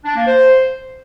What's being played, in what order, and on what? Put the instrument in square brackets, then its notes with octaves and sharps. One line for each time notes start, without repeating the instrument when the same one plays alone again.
[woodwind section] D4
A#3
C5